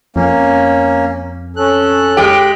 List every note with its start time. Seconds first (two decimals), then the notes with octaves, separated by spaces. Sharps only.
0.16 F2 A#3 C#4
1.56 C#4 A4 F#6
2.17 G#3 G4